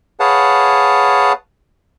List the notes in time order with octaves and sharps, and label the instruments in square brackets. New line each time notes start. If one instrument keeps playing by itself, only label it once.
[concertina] G#4 B4 C#5 F5 F#5 A5